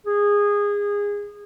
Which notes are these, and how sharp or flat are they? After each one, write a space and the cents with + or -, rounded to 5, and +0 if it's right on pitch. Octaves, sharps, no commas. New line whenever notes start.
G#4 -20